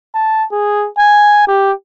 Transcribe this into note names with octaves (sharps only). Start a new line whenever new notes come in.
A5
G#4
G#5
G4